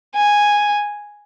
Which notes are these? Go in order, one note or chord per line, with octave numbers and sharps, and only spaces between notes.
G#5